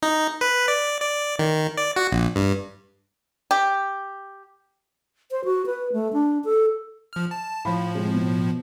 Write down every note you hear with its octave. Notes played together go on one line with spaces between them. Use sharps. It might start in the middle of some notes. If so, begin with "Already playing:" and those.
D#4
B4
D5
D5
D#3
D5
F#4
A#1
G2
G4
C5
F#4
B4
A3
D4
A4
F3 F6
A5
A2 F3 F5 B5
C3 G#3
B2